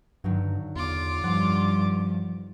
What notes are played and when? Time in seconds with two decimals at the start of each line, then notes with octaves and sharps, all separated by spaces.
0.24 G2 D3 D#3 F#3
0.76 E2 F4 D6
1.24 G2 F3 F#5 C6